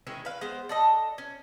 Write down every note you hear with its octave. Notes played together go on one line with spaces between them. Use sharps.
D#3 G#3 C#4 E4
B4 F5
G#3 B3 C5
D4 A4 D#5
C#4